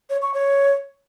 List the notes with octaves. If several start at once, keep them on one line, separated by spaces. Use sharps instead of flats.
C#5
C#6
C#5